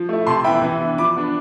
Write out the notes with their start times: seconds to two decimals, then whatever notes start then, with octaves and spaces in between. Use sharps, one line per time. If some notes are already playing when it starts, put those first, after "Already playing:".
Already playing: F3
0.09 A3 E4
0.27 C3 A5 C6
0.44 E3 B3 E4 G5 B5
0.62 E3
0.80 B3 D4
0.98 F3 B5 D6
1.16 B3 D4